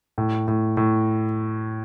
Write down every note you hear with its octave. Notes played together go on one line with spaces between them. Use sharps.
A2
A2
A2